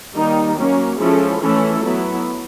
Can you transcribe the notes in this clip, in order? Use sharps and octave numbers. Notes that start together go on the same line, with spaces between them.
D#3 G3 A#3 D#4
F#3 A#3 C#4
F3 G#3 C#4 E4 A4
E3 A3 C#4 E4 A4
F#3 B3 E4